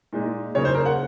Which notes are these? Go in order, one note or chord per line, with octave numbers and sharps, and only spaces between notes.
A#2 G#3 D#4
C#3 F#3 A#3 D#4 C#5
C5
A#4
F#5